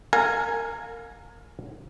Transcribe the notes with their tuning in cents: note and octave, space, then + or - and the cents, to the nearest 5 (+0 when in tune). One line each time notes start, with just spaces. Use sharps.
A#4 -20 F5 +35 G#5 +0